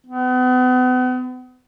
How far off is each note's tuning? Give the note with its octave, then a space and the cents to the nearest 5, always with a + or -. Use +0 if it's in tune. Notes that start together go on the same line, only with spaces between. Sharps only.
B3 +40